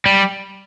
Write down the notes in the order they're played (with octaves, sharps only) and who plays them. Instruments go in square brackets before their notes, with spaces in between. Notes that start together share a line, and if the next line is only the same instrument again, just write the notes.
[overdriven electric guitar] G3